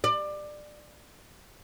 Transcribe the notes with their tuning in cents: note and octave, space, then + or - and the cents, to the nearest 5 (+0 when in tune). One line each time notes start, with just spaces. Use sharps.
D5 +20